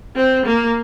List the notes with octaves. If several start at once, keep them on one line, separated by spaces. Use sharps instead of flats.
C4
A#3